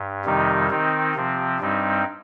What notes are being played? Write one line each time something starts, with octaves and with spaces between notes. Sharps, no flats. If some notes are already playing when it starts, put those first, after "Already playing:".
Already playing: G2
F2 C3 D#3 G3 D#4
D#3 C4 D#4
C3 F3 C4
G2 G3 C4 D#4